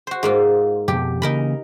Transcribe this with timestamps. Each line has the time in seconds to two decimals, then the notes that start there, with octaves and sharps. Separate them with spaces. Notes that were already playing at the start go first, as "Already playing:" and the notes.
0.07 F#4 C5
0.23 G#2 A#3 F4
0.88 F2 B2 G4
1.22 C#3 E3 A#3 D#4 A#4 B5